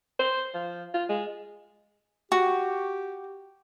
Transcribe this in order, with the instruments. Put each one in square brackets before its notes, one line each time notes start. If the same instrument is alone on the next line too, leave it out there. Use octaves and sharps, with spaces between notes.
[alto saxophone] C5
F3
F4
G#3
[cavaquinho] F#4 [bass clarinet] G4